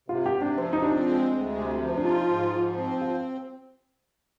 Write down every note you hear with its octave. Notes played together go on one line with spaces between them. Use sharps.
C3 F4
G4
C3
D4
F3 C4
D#4
C4 D4
G#3
D2
C3
F3
C4
D4
D#4 F4
G#2
F3
C4
F4